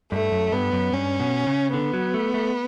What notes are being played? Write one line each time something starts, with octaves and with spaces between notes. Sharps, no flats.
G2 A3
F#2
G2 B3
F#2
G2 C#4
B2
C#3
D3 B3
F#3
A3
A3